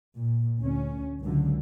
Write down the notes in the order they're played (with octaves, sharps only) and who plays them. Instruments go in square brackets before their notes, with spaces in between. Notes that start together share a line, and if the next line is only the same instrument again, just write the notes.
[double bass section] A#2
D2 C#4
C#2 D3 F#3